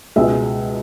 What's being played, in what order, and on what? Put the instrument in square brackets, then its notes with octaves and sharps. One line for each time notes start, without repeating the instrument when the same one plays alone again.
[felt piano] C#2 B2 G#3 E5